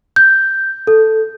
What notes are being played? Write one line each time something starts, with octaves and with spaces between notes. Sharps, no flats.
G6
A4